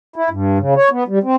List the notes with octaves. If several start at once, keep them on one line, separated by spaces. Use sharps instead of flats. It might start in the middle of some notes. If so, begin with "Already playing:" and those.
E4
G2
C#3
C#5
B3
G3
C4